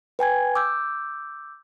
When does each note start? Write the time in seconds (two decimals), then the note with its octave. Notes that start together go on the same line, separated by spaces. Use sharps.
0.19 B4 G5 G#5 G#6
0.55 D6 E6 G6